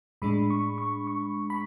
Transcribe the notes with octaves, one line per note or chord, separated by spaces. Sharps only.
A2 G#3 D4 B5
C#6
C#6
C#6
B5